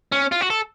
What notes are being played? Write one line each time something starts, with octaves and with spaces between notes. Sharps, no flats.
C#4
F4
F#4
A4